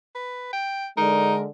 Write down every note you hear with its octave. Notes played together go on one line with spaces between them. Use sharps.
B4
G5
D3 G#3 D#4 A#4